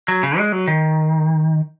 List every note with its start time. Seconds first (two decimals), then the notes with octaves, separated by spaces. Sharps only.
0.08 F#3
0.23 C#3
0.38 G#3
0.52 F#3
0.68 D#3